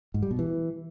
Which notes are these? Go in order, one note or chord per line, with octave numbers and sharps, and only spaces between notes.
G#2
G3
B2
E3